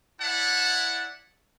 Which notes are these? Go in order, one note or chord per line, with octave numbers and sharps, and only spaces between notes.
E4 C#5 D5 E5 F#5 A5